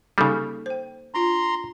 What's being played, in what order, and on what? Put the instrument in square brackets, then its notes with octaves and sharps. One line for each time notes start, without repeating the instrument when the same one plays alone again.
[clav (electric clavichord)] C#3 G3 [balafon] A#3 D#4 A4
[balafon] C5 G5
[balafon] D4 F4 [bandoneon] A#5 C6